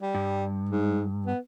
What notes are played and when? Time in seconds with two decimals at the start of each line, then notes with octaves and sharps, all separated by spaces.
0.02 G3
0.15 G2
0.69 G#2
1.26 B3